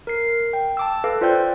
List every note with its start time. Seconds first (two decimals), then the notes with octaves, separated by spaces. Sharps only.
0.07 A#4 C7
0.53 G5
0.77 A5 D6 E6
1.04 A4 B4 F5 D6
1.21 F4 C5 D5 G5 G6